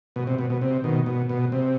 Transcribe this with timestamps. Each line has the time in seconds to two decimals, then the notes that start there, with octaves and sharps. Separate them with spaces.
0.16 B2
0.27 C3
0.39 B2
0.50 B2
0.62 C3
0.84 B2 D#3
1.06 B2
1.29 B2
1.52 C3